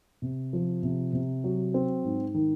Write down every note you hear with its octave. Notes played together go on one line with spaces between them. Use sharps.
C3
F3
C3
C3
F#3
C4
G#2
D#3